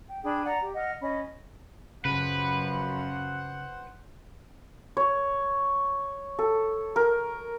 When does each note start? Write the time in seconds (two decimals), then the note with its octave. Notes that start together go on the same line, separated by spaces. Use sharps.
0.08 G5
0.23 D4 G#4 G5 B5
0.44 D5 F#5 A#5
0.62 G4
0.75 D#5 F#5 F6
1.01 C#4 D#5 B5
2.05 F#2 C#3 F3 B4 C5 F#5
4.97 C#5
6.39 A4
6.96 A#4